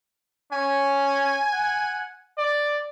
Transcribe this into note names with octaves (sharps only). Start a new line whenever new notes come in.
C#4 G#5
F#5
D5